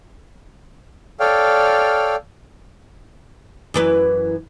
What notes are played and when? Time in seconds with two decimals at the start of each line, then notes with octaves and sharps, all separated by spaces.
1.20 A4 C#5 D5 F5 G5 F6
3.74 F#2 E3 B4